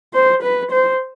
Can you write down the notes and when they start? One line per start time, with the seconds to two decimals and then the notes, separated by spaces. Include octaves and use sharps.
0.14 C5
0.43 B4
0.72 C5